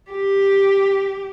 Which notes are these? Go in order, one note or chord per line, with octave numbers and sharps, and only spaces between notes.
G4